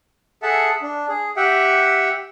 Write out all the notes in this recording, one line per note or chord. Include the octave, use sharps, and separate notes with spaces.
G#4 A4 E5 F#5 A5
D4
G#4
G4 E5 F#5 G5